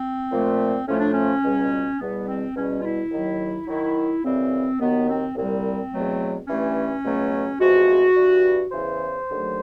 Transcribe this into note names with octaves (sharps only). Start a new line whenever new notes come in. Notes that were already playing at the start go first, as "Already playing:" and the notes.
Already playing: C4
A#2 F3 A3
A2 F3 A3 C#4
D4
C#4
C#2 B2 G3
E2 B2 G3 B3
C4
E2 B2 G3 C#4
F4
E4
D#2 D#3 F#3
D#2 D#3 F#3 E4
F#2 C#3 E3 G3 C4
D#2 D#3 F#3 B3
C4
C2 A#2 G3 C4
E2 B2 F#3 A3
G2 E3 A3 C#4
C#2 B2 F#3 A3
E2 C3 F3 G#3 F#4
G2 E3 G3
E2 C#3 E3 C5
D#2 D3 F#3 A3